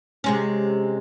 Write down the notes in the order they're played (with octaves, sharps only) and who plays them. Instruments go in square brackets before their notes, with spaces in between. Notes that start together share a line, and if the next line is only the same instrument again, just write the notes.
[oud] C3 G#3 C#4